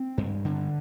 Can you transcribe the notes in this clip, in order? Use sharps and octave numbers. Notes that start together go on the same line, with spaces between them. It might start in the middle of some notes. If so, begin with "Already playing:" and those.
Already playing: C4
G2
D3